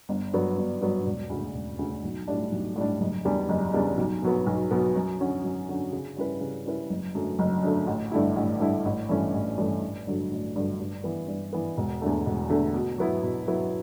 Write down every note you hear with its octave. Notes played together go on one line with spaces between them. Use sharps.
G1
G2 F#3 B3
G1
G2 F#3 B3
E1
D2 C#3
E1
D2 C#3
B1
A2 G3 D4
B1
A2 G3 D4
F#1
E2 C#3 G3 D4
F#1
E2 C#3 G3 D4
B1
B2 F#3 B3
B1
B2 F#3 B3
F#2
D3 F#3 C#4 F#4
F#2
D3 F#3 C#4 F#4
C#3
G3 C#4 E4 B4
C#3
G3 C#4 E4 B4
F#1
F#2 D3 A3
F#1
F#2 D3 A3
A1
G2 D3 A3 E4
A1
G2 D3 A3 E4
A1
G2 E3 A3 C#4
A1
G2 E3 A3 C#4
A1
G2 D3 F#3 A3
A1
G2 D3 F#3 A3
G2
E3 B3
G2
E3 B3
E1
E2 D3 A3
E1
E2 D3 A3
B2
F#3 B3 E4
B2
F#3 B3 E4